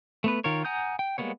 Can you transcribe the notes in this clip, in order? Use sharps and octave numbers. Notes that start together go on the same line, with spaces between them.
A3 B3 B4
D#3 F4 A#4 C#5
F#5 G#5 A#5 D#6 G6
G5
G3 G#3 A#3 B3 C#5